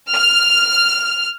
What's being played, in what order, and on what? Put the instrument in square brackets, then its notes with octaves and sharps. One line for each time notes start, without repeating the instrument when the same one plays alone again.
[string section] F6